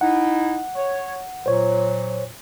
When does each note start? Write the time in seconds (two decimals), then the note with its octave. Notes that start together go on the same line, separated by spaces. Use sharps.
0.01 D#4 E4 F#5
0.76 C#5
1.46 A#2 F#3 C5 C#5